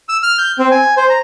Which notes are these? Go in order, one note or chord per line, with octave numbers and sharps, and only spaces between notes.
E6
F6
G6
C4
G#5
C5
A#5